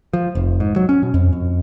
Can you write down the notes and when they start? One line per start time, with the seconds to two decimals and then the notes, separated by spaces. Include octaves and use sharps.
0.13 F3
0.35 F1
0.60 G#2
0.76 F#3
0.89 C#4
1.03 B2
1.14 F2
1.33 F2